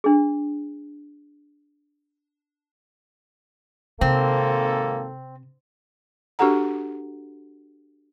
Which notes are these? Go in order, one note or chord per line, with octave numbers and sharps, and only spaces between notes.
D4 G#4
G#1 C3 A#3 C4 A4
D4 F#4 G4 A4 F#5 A#5